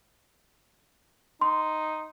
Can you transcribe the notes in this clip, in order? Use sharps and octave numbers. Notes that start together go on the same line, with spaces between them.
D#4 C6